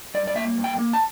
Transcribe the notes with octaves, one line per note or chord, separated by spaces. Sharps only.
G2 D5
D5
A#3 E5
G2
G5
A#3
A5